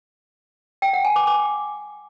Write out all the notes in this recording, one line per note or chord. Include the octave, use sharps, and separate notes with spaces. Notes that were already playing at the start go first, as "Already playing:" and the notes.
G5
F#5
G#5
D6
D6